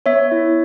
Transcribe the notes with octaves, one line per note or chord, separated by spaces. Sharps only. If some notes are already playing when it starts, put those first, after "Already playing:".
B3 C#5 E5
E4